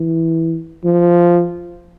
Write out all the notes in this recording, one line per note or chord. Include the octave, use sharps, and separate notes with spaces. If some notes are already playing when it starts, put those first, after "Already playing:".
Already playing: E3
F3